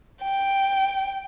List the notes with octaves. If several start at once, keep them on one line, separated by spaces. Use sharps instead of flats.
G5